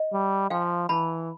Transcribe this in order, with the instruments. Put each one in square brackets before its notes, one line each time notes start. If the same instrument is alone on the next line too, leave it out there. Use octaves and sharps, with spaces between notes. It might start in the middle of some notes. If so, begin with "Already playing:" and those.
Already playing: [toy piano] D#5
[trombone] G3
[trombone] F3 [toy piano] F5 G5
[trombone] E3 [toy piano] A5 B5